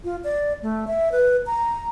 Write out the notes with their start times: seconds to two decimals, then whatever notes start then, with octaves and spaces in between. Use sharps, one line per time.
0.04 F4
0.24 D5
0.62 A3
0.87 E5
1.12 B4
1.46 A#5